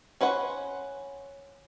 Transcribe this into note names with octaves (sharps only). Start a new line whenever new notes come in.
C#4 B4 C5 F#5